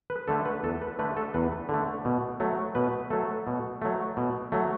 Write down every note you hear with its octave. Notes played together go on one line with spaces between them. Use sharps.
B4
D3 A3 A4
B4
E2 A4
B4
D3 A3 B4
A4
E2 B4
D3 A3
B2
F#3 A3
B2 B4
F#3 A3 A4
B2
F#3 A3
B2
F#3 A3